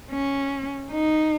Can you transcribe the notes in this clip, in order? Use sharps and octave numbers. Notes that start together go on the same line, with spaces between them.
C#4
D#4